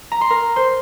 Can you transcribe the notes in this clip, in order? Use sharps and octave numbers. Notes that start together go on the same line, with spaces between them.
A#5
C6
A#4 A#5
C5 C6